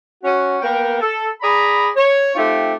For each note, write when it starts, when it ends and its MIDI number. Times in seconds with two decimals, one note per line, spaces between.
0.24 0.58 61
0.24 0.58 66
0.62 0.99 58
0.62 0.99 59
0.62 0.99 70
0.62 0.99 79
1.01 1.28 69
1.41 1.88 68
1.41 1.88 74
1.41 1.88 82
1.41 1.88 83
1.96 2.31 73
2.35 2.73 57
2.35 2.73 60
2.35 2.73 63
2.35 2.73 65
2.35 2.73 67